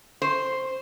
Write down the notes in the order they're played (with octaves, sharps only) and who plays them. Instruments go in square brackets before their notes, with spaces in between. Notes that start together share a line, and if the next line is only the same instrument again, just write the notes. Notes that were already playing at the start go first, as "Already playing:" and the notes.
[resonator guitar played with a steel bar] C5